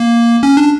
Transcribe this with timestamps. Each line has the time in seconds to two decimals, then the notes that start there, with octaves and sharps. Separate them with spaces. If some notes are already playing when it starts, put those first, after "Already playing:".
Already playing: A#3
0.43 C#4
0.57 D4